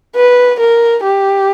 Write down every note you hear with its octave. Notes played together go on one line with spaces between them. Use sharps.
B4
A#4
G4